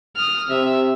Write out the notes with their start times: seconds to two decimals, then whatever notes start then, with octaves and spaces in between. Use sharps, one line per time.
0.16 D#6 F6
0.50 C3 E5